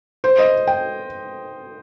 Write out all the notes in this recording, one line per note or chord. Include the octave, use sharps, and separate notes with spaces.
C5
D#5
G5